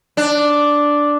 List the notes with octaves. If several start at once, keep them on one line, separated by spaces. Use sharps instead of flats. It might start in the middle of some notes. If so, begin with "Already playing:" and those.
D4